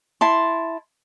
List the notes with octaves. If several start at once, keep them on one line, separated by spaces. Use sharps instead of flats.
E4 A5 C6